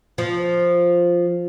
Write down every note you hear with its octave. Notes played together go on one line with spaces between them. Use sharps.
F3